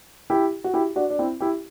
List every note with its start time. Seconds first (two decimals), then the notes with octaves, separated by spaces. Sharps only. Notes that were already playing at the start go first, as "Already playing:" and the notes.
0.30 E4 G4
0.64 F#4
0.74 E4 G4
0.96 D4 F#4
1.10 D4
1.19 C4 E4
1.40 E4 G4